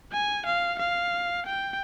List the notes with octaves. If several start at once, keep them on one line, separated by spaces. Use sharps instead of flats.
G#5
F5
F5
G5